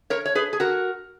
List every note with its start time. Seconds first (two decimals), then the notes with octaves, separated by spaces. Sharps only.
0.10 A#4 C#5
0.26 C#5
0.35 G#4 B4
0.53 G#4
0.60 F#4 A#4